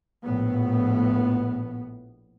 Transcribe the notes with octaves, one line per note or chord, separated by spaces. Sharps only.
A#1 A2 B3